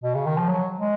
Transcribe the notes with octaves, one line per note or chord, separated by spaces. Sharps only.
B2
C#3
D#3
F3
F#3
G#3